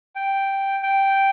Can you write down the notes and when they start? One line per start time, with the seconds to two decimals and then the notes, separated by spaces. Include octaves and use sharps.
0.16 G5
0.82 G5